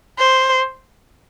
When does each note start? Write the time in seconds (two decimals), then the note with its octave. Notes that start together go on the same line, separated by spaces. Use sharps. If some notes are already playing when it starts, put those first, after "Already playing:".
0.19 C5